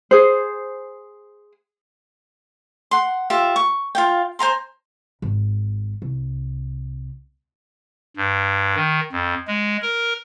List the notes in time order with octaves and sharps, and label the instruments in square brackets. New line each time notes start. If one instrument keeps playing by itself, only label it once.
[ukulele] G#4 C5
[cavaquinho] F#5 C6
F4 G4 E5
C#6
F4 F5 G5
C5 G#5 A#5 C6
[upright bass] G#1
C2
[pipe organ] G2
D#3
F2
G#3
A#4